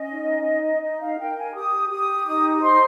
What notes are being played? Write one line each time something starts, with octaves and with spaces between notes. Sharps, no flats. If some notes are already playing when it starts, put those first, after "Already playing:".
Already playing: C#4 D#5
D#4
D#4
D#4 D#5
F5
A#4 G5
G#5
G4 D#6
G4 D#6
D#4 D#6
C5 C6